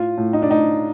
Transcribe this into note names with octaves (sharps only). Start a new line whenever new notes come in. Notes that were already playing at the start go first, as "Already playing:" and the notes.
Already playing: A2 F4
A2
D#4
D4
A2 D#4